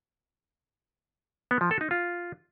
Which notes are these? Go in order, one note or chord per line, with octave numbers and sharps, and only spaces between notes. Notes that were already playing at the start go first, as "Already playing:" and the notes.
B3
F3
A4
D#4
F4